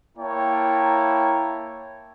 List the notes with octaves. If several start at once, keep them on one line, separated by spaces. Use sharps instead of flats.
A#3 E4 C#5 G5 A5 A#5